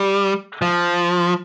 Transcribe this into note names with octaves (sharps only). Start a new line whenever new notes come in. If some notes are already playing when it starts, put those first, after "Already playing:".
Already playing: G3
F3